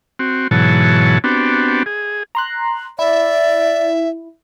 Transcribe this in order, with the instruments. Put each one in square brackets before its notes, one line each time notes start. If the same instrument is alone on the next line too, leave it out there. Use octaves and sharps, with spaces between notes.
[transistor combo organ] C4 F#4
G#2 B2 E3 F#3 C#5 A5
B3 C4 D4 F#4 G4
G#4
[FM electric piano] A#5 C6 F#6
[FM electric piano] E4 [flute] D5 [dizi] E5